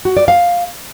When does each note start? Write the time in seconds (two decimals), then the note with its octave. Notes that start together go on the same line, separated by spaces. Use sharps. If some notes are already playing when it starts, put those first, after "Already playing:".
0.05 F#4
0.17 D5
0.28 F5